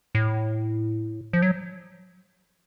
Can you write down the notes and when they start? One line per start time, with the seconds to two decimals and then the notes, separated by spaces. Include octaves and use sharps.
0.15 A2
1.33 F3
1.42 F#3